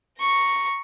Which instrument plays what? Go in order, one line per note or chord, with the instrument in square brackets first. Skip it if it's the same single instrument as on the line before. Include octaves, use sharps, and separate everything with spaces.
[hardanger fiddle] A#5 C#6